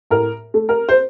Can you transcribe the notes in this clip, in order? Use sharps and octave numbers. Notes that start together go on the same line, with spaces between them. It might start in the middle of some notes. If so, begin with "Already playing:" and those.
A2 A#4
A3
A#4
C5